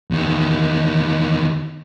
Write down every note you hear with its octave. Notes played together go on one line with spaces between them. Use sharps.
E2 D#3